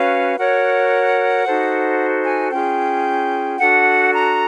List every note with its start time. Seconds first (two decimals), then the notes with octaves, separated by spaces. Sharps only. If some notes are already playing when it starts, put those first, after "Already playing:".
Already playing: C#4 F#4 B4 F5
0.38 F#4 A#4 C#5 F#5
1.45 D#4 F#4 A4 C5
2.25 G#5
2.51 C#4 F4 G#4 G5
3.58 D4 F#4 A4 F#5
4.12 A#5